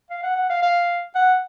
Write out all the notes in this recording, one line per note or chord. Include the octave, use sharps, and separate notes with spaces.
F5
F#5
F#5
F5
F5
F#5